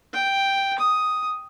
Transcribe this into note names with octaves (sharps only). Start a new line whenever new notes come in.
G5
D#6